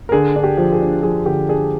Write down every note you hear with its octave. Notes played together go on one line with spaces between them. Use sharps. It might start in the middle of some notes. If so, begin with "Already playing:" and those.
A#4
D3 G#4
D4
G4
F3
G#4
D4
F3 G#4
D3 G4
D4 G#4